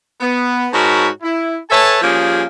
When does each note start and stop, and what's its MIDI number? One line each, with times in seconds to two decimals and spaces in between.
0.21 0.67 59
0.73 1.07 44
0.73 1.07 66
0.73 1.07 70
0.73 1.07 73
0.73 1.07 81
0.73 1.07 83
1.22 1.55 64
1.70 1.98 69
1.70 1.98 71
1.70 1.98 73
1.70 1.98 76
1.70 1.98 80
1.70 1.98 81
2.02 2.44 53
2.02 2.44 55
2.02 2.44 58
2.02 2.44 61
2.02 2.44 68